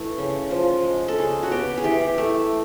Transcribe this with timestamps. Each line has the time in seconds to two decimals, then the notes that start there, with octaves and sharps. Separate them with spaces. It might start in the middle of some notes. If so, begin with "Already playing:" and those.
Already playing: E3 A3
0.18 C#3
0.51 F3
0.84 G#3
1.08 A4
1.18 C#3 G#4
1.43 F#4
1.52 B3 G4
1.78 G#4
1.84 E3 G4
2.18 A3